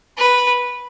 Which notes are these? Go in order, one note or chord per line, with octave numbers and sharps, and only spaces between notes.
B4